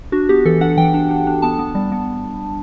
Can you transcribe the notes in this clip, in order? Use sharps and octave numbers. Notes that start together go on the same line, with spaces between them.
D4 F#4
B3 G4
E3 A4
D4 F#5
E3 G5
D4
D4
D4
B3 A5
B3
G3
B3